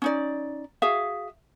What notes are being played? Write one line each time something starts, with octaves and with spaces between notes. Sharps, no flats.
C#4 D#4 D5
F#4 G#4 E5 F5